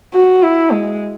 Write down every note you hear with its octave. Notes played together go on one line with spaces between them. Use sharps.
F#4
E4
G#3